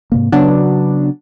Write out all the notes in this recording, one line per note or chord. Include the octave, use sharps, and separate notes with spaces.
G#2 C3 A#3
C#3 F#3 B3 D4